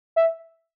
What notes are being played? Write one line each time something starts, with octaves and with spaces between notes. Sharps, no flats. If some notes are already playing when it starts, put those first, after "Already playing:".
E5